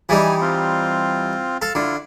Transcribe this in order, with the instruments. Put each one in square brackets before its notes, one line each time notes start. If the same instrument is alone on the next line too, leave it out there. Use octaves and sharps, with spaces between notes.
[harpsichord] E3 G3 D#4 [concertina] G#5
[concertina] C4 F4
[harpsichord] A4 [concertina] F5
[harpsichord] D3 [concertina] E4 F4